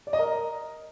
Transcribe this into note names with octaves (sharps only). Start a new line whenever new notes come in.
D5
D#5
A#4